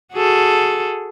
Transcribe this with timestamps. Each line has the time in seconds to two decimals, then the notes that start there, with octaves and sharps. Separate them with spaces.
0.12 F#4 G#4 A4